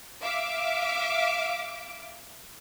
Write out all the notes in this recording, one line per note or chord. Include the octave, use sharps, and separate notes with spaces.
E5 F5 D6